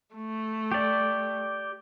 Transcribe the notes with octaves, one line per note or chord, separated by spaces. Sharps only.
A3
G4 D5